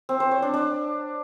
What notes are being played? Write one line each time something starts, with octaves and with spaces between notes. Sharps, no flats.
C4
C5
C#5
D4
D4